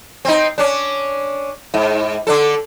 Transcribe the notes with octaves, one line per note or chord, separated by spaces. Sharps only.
C4 D#4
C#4 D4
G#2
D3 D4 A4